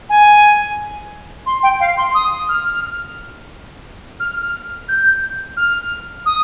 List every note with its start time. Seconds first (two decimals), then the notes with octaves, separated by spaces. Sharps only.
0.09 G#5
1.46 C6
1.63 G5
1.80 F5
1.97 C6
2.14 D#6
2.49 F6
4.20 F6
4.37 F6
4.88 G6
5.57 F6
6.26 D#6